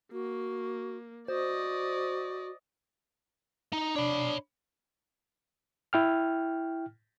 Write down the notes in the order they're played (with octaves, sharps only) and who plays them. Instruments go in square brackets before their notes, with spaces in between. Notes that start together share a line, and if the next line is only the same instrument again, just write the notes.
[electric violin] A#3 [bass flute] F#4
[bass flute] F#4 [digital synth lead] C5 [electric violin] D5 D#5
[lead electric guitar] D#4
[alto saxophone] D4 [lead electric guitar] C#5 B5
[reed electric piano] E4 G5 F6